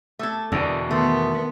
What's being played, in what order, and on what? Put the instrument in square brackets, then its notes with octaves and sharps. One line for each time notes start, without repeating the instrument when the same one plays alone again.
[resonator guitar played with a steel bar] A3 A4 [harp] D6 E6 G#6
[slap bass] E2 B2 [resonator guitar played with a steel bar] D3 [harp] A4
[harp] D#3 C6 B6 [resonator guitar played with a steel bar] A3 [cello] B3